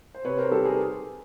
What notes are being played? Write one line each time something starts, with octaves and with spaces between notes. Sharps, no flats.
C5
C3 B4 C#5
A#4 C5
D#3 G3 G4 A4
G#4 A#4